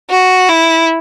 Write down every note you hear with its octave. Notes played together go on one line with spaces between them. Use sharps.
F#4
E4